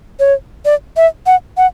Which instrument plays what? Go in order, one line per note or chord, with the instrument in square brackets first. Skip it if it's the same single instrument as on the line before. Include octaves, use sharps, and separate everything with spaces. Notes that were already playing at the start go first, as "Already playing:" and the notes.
[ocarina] C#5
D5
E5
F#5
F#5